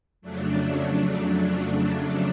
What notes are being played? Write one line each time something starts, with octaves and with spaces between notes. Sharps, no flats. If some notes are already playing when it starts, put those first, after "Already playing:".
F2 C#3 F#3 A3 D4